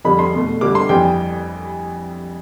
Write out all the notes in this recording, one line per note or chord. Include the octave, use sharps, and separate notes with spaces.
F2 D3 G3 B5
C6
E2 B2 A3
G2 D3 G3 D6
C6
F2 E3 G3 G5